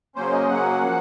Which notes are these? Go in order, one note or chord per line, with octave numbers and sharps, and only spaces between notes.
C#3 F#3 A#3 C#4 C5
D#5
C#3 F#3 A#3 C#4 F#5
F3 A#3